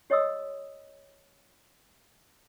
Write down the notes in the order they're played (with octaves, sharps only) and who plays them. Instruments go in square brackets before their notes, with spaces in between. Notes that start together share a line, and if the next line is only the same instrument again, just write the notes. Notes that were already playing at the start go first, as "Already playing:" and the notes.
[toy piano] G4 C#5 D#5 C6 D#6 E6